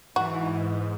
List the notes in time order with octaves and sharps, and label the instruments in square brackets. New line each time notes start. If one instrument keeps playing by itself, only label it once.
[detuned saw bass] G#2 [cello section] E3 [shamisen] F#4